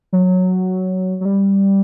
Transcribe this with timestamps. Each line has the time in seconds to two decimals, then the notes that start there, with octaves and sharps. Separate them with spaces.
0.13 F#3
1.21 F#3
1.25 G3